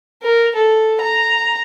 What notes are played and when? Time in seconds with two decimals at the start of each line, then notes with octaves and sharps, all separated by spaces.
0.22 A#4
0.55 A4
1.01 A#5